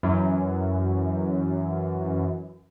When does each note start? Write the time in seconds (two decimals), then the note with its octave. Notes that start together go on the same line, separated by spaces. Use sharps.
0.03 F#2 E3